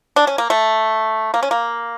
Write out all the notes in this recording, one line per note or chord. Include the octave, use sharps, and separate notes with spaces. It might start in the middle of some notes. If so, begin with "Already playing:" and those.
D4
C#4
A#3
A3
A#3
C#4
A#3